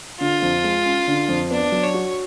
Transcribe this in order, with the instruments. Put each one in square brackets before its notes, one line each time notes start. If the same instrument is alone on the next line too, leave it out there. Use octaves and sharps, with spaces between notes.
[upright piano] D3 [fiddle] F4
[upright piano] F2
G#3
C#4
D3
F2
[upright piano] B3 [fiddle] D4
[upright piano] F#3
[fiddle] C#5
[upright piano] F#4